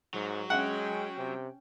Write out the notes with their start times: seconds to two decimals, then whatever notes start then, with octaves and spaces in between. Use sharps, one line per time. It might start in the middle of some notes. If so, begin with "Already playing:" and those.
0.14 G#2 F#3
0.50 G#3 C#4 F#5 G5
1.18 C3